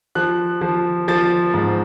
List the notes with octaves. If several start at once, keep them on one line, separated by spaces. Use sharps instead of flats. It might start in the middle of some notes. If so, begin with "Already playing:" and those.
F3 F#6
F3
F3 A6
G#2